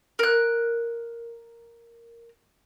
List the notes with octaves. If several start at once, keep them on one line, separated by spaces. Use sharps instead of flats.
A#4 F#6